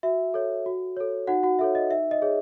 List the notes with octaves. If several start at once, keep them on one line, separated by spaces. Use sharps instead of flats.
F#4 E5
A4 C#5
F#4
A4 C#5
D#4 F#4 F#5
F#4 F#5
F#4 A4 C#5 E5
D#5
D#4 E5
D#5
G#4 C#5